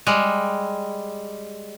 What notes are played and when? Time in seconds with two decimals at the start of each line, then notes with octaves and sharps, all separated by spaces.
0.07 G3 G#3